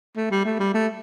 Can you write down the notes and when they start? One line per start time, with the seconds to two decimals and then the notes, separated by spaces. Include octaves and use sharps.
0.16 A3
0.31 G3
0.45 A3
0.60 G3
0.74 A3